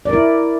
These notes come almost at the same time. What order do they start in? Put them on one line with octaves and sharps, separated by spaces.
D5 A#4 E4